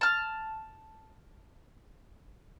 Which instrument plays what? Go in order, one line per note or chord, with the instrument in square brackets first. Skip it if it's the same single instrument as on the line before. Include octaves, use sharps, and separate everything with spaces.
[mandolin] A5 F6